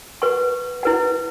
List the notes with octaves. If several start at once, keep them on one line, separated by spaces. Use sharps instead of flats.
B4 F#5 C#6
E4 B4 F#5